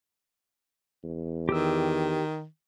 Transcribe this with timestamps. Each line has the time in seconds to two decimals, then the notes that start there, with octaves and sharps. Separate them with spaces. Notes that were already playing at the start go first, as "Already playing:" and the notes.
1.04 E2
1.49 D#3 G4 E6